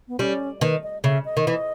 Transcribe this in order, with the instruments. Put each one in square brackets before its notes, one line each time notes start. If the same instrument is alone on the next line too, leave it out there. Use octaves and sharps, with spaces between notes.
[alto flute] B3
[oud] G3 [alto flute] C#4
[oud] D#3 [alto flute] B4
[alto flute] D#5
[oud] C#3 [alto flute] E5
[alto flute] D#5
[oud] D#3
E3